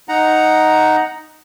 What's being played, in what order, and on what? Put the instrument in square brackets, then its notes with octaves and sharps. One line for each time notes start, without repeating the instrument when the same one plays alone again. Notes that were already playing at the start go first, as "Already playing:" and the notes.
[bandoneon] D#4 F#5 A#5